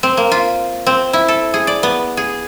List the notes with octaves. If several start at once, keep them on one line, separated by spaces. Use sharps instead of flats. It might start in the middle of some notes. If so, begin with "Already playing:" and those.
C4
A#3
F4
C4
E4
A4
G#4
D5
B3
G#4